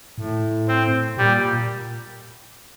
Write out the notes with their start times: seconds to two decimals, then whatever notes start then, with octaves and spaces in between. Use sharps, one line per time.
0.18 A2
0.68 C4
1.17 A#2 G3